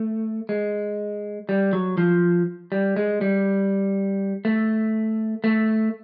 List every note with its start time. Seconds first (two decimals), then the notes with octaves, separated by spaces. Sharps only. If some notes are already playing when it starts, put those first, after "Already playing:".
Already playing: A3
0.49 G#3
1.49 G3
1.73 F#3
1.98 F3
2.72 G3
2.96 G#3
3.21 G3
4.45 A3
5.44 A3